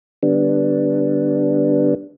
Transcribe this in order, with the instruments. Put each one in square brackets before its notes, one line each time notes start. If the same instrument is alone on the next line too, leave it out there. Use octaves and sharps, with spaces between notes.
[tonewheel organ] D3 G3 B3 D4